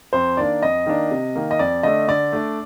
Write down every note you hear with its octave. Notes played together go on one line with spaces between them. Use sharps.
F2 C5
D#3 A#3 D4 D5
F2 D#5
D#3 A#3 D4
C3
D#3 A#3
D#5
F2 D5
D3 A3 D4 D#5
D3 D5
A3 D4